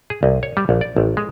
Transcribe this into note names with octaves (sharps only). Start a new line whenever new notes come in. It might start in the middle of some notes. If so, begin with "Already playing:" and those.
G#4
C2
C#5
G3
A#1
D5
A1
G#3